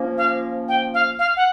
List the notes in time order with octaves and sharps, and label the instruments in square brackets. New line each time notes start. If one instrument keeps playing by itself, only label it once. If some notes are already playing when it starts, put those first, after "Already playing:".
Already playing: [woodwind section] F3 A#3 C#4
[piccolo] F5
G5
F5
F5
F#5